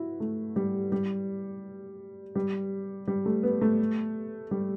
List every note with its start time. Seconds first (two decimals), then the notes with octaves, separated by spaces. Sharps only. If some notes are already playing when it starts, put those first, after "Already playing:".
Already playing: E4 F#4
0.20 A3
0.56 G3
0.92 G3
2.35 G3
3.07 G3
3.25 A3
3.43 B3
3.61 A3
4.51 G3